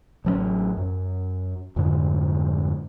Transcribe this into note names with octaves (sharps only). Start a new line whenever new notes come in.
A1 F#3 A#3 C#4
F#2
F2 G#2 D3